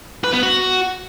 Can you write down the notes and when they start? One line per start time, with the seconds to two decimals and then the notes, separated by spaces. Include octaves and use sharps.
0.24 B4
0.33 B3
0.43 F#4